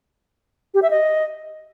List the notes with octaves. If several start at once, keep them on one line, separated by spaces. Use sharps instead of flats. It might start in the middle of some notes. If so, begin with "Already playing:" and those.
G4
E5
D#5